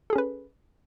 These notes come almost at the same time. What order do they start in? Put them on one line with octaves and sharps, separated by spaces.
A4 G#4 C#4 B4